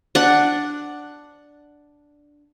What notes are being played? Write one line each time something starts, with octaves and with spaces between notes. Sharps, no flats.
D4 F#5